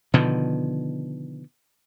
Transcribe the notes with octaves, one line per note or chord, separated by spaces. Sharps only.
B2 D3 D#3 F3